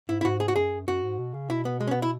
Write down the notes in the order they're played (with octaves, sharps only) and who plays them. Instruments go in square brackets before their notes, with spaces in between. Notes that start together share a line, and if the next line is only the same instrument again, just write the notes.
[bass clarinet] G#2 [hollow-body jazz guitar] E4
[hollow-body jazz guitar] E4
[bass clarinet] G#2 [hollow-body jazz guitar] F#4
[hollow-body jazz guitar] G#4
F#4
[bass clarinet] F#2 [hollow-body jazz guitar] G#4
[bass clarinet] F#2 [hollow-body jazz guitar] F#4
[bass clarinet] G#2
B2
C#3
[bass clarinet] B2 [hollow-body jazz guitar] E4
[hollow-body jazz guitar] B3
G#3
C#4
B3
E4